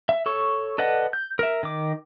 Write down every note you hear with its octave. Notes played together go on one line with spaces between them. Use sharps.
E5
A4 C#5 C#6
A4 B4 D5 D#5 F#5
G6
A#4 E5
D#3 D6